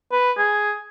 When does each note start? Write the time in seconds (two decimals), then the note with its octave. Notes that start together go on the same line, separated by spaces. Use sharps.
0.12 B4
0.38 G#4